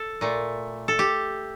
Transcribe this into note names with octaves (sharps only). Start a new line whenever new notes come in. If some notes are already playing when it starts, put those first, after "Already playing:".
Already playing: A4
A#2 A3
A4
G4